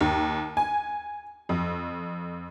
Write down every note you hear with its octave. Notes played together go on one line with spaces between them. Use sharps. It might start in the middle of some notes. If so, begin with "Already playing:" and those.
D#2
G#5
F2